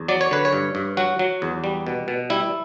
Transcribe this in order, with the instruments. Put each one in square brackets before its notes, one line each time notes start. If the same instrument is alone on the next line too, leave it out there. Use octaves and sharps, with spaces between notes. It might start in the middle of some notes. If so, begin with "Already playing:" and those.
Already playing: [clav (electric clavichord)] E2
F#3 D5
C#5
D3 B4
C#5
G2
G2
F#3 F#4
F#3
E2
G3
B2
B2
G3 E4